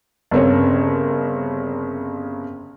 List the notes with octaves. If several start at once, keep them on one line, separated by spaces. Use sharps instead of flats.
G1 C#3 C4 A#4 C#5